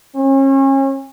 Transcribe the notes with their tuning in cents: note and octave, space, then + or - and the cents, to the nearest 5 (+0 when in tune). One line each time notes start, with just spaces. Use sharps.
C#4 -35